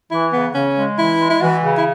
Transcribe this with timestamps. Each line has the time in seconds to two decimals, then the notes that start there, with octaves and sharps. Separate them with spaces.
0.11 E3 E4
0.32 C#3 B3
0.55 C#3 C#4
0.76 G#3
0.98 E3 E4
1.20 G#3
1.30 E4
1.41 E3 F#4
1.63 C#3
1.78 E4